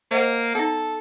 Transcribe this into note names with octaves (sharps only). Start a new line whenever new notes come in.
A#3 C5 D#5 F#5
B3 D#4 A4